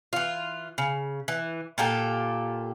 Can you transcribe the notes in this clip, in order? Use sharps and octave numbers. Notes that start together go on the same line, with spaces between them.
E3 F4
C#3
E3
A#2 F4 G4 A4